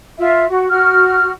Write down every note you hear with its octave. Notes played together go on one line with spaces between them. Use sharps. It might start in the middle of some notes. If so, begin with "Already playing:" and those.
F4 E5
F#4
F#4 F6